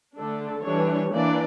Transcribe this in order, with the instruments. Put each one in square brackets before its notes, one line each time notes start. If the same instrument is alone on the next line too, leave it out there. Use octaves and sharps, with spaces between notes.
[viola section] D3 A3 D4 A4
E3 G3 D4 C#5
E3 A#3 D4 D5